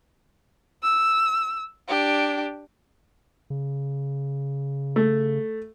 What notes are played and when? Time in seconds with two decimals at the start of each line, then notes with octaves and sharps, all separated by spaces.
0.83 E6
1.88 D4 G4
3.50 C#3
4.96 A3